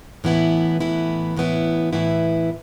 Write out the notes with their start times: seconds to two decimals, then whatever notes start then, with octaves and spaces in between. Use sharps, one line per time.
0.24 A2 E3 B3 E4
0.80 A2 E3 B3 E4
1.36 A2 E3 B3 E4
1.93 A2 E3 B3 E4